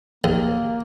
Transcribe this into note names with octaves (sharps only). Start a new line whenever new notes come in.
D#2 A#3